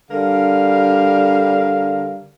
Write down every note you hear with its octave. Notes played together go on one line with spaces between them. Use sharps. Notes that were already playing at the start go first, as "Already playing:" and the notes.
D3 G3 A#4 F5